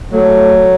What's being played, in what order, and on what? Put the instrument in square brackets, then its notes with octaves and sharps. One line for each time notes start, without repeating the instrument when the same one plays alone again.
[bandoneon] F#3 [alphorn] A3